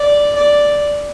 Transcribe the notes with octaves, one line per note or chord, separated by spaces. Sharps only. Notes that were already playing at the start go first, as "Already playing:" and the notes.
Already playing: D5
D5